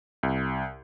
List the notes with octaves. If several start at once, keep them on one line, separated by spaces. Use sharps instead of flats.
C2